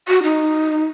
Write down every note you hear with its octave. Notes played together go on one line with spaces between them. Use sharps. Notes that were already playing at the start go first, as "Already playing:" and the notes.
F#4
D#4